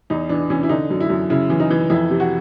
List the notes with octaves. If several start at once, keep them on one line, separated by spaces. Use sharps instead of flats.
E2 D#4
E3 D4
E3 C#4
E4
D3 D#4
F#2
E4
F#2
C#3 E4
E3
D#4
E3
F2 E4
C3
F#4